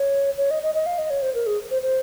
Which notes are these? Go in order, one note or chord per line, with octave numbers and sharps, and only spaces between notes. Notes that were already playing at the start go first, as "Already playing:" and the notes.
Already playing: C#5
C#5
D#5
D#5
D#5
F5
D#5
C#5
C5
A#4
G#4
C5
C5